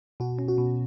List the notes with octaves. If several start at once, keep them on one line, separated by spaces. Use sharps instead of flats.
B2 F#4
C#4
F#4
B2